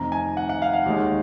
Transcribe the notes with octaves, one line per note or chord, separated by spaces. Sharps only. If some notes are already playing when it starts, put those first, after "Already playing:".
Already playing: F1 F2 D#3 A#5
G#5
F#5
F#5
F5
F5
D#2 D#3 G#3